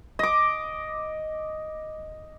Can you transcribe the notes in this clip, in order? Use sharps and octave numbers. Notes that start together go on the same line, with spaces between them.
D#5 D6